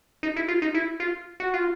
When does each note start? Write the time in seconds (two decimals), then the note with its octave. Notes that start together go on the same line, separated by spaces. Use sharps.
0.23 D#4
0.36 E4
0.48 F4
0.62 D#4
0.74 E4
1.00 F4
1.40 F#4
1.54 F4